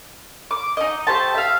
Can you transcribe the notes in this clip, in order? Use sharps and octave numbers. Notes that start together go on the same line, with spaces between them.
D6
D#4 D#5
A3 G4 C5 A5
E5 F5